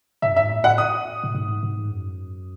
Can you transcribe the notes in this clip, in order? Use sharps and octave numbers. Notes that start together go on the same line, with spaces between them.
G#2 E5
F#2
E5
G#2
A2
F#5
D#6
A2
G#2
G#2
F#2